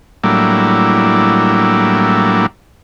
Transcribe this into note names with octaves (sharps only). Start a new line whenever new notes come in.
A2 F#3 G3 A#3 D4 E4